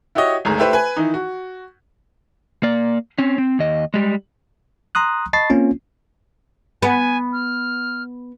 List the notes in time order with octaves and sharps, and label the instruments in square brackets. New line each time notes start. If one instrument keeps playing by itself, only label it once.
[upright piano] E4 F#4 G4 C#5 D#5
G#1 D2 G#4 A#5
A3 E4 G4 B4 C5 E5
B4 G#5
D#3 E3 D#4
F#4
[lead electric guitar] A#3 D5
C4 C#4
C4
D#2 D#5
G3 G#3
[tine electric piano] A#5 C6 D#6 F#6
D#5 A5 B5 C#6 A6 C7
A#3 C4 C#4 F4
[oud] B3 [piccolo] G#5
[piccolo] F6